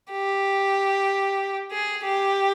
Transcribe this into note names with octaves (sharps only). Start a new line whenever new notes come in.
G4
G#4
G4